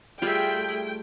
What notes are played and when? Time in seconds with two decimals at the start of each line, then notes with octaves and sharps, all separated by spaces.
0.22 G3 A3 F4 G#4 E5 G5